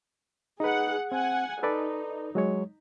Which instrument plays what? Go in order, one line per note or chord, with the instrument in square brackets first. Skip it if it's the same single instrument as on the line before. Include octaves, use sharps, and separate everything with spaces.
[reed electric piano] D#4 B4 [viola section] G#4 F#5
[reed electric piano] C4 [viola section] F#5 G#5
[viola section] D#4 [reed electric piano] A4 B4 D5
[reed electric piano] F#3 G#3 C#5